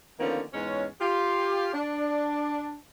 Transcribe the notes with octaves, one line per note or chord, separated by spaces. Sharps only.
D3 D#3 F3 A#3 B3 C#4
E2 G#2 G#3 C#4
F4 G4
D4